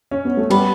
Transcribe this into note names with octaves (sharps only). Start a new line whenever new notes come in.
C#4
B3
A3
G3 B3